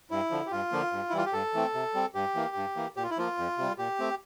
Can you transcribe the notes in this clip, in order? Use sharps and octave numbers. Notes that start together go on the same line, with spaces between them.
G2 E4
D3 F3
G4
G2 F4
D3 F3 A#3
G2
E4
E3 G3 F4
G4
G2 A4
E3 A3 C4
C3
G3 C4
G2 G4
E3 A#3
G2
E3 A#3
A#2 G4
F4
E4
F3 A#3 F4
F2
C3 G3
A#2 G4
A3 C4